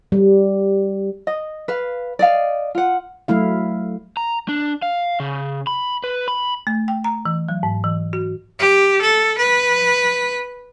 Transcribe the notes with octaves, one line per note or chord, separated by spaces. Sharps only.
G3
D#5
B4 F5
D5 D#5 F5
F4 F#5
F#3 A3 E4 F5
A#5
D4
F5
C#3
B5
B4
B5
A3
G5
A#5
E3
F#3
G#2
E3
F#4
G4
A4
B4